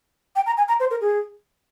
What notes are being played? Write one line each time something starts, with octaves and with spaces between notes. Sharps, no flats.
G5
A#5
G#5
A#5
C5
A#4
G#4